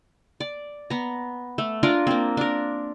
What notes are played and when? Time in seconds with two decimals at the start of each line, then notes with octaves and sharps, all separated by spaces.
0.40 D5
0.90 B3 A#5
1.58 A3
1.83 D4 F4 A#4 D5
2.07 A#3 C4
2.37 D4 A#4